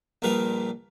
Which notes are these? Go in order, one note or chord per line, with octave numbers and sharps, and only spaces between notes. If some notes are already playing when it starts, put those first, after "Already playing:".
A#1 A#2 G3 A#4 B4 F5